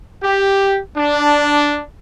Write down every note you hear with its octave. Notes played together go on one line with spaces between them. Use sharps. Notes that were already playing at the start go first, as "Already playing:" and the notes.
G4
D4